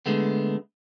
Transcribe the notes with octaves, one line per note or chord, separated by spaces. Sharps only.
D3 G#3 A3 B3